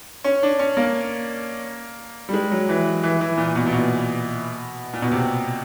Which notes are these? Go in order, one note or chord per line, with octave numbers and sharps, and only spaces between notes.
C#4
D4
C#4
A#3
G3
G#3
F#3
E3
E3
E3
A#2
B2
A#2
B2
A#2
B2
C3